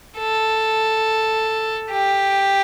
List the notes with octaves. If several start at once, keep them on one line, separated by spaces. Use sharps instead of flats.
A4
G4